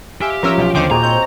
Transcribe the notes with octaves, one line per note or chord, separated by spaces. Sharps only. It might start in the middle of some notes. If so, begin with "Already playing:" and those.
G4 E5 F5 G#5 C6
F3 C#4 F4 A#4 E5
B1
D#2 D3 C5 G5 D6
A#2 D#4 F#4 G#4 A#5
C4 C#5 G6